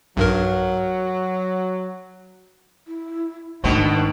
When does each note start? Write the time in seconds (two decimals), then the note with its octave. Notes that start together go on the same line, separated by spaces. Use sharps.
0.17 B1 G2 F#3 A#4
2.87 E4
3.64 G#2 B2 D#3 A3 B3 C4 D4